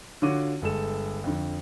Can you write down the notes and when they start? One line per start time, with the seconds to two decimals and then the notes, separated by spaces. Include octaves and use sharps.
0.22 D3 F4 F#4 C#5 D6 D#7
0.62 G1 G#3 A4 E7
1.24 F2 D3